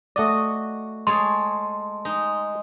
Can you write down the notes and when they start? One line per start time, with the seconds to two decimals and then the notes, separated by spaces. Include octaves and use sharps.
0.16 A3 F#4 D5 D#5
1.07 G#3 A4 C#5 C6
2.05 G#3 D#4